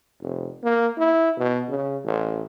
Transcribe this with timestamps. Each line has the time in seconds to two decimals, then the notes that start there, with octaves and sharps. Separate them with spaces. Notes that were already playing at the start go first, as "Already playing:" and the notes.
0.21 F1
0.63 A#3
0.98 E4
1.37 B2
1.69 C#3
2.05 A1